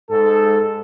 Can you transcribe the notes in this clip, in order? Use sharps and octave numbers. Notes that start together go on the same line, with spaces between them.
G#2 A4